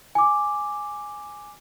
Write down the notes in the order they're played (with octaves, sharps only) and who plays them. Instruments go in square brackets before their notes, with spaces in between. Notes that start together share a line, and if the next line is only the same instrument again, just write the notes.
[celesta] G#5 D6